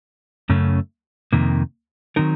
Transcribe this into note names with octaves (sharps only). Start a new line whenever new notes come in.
F#2 C#3 A3 C#4
F2 C3 D#3 A#3
D#3 F#3 C4 D#4 A#4